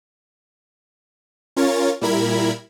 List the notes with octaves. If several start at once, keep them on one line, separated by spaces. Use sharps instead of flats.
C#4 F4 A#4 C#5 A6
A#2 G3 E4 A#4 B5 G#6